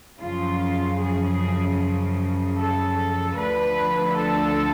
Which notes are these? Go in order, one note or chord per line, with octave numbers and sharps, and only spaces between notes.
F#2 C#3 F3 F4
G#4
A4
D2 D3 F3 B4
A4